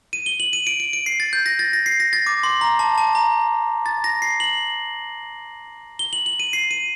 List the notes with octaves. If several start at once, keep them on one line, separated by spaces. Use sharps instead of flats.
D#7
G7
F#7
D#7
D7
D7
D7
C7
A6
G6
A#6
A6
A#6
C7
A#6
A6
D6
C6
A#5
A5
A5
A#5
A6
A#6
C7
F#7
G7
F#7
F#7
D#7
C7
D#7